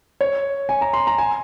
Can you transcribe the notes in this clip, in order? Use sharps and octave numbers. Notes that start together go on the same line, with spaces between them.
C#5
G#5
A#5
C6
A#5
G#5